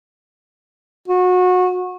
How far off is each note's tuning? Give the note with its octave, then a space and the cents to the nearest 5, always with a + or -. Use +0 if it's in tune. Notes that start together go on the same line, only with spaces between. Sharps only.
F#4 -25